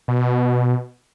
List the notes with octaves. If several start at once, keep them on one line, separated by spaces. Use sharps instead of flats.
B2